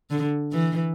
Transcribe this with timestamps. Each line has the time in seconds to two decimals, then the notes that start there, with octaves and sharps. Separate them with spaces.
0.10 D3
0.52 E3